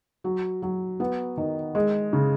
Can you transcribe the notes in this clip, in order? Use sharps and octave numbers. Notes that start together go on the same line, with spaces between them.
F#3
F#3
B3
D#3
G#3
C#3